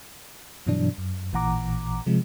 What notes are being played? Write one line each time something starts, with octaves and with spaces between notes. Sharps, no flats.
G2 B2 E3 F#3 D4
F#2
A1 A#2 E3 F#5 A#5 D6
C3 F3 G#3